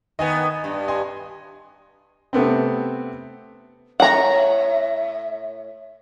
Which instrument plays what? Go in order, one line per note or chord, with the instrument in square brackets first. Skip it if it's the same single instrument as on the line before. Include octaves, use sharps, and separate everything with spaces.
[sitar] D#3 B3 [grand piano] D#5 G#5
[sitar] G2
[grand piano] D#5 G#5 C6
[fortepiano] C3 A3 B3 C4
[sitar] A2 C#5 [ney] E5 [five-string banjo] F#5 A#5